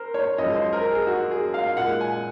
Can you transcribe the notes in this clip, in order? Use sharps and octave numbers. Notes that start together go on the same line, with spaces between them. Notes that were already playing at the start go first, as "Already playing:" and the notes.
Already playing: A#4 C5
C#5
F#2 F3 G#3 D#5
C5
A#4
G#4
F#4
G#4
F5
A#2 G#3 F#5
G#5